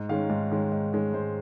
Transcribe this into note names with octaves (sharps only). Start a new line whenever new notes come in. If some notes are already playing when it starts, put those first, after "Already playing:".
Already playing: G#2
D#3 G#3 C#4 F5
G#2
D#3 G#3 C#4
G#2
D#3 G#3 C#4
G#2 C5